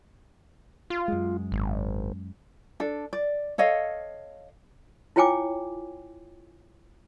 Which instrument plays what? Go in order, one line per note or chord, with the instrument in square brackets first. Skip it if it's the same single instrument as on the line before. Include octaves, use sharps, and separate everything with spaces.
[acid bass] F4
[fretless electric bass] F#2 G#3
[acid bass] G#1
[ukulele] D4 A4
D5
A4 C#5 D#5 F5
[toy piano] E4 F4 C#5 G5 G#5 D6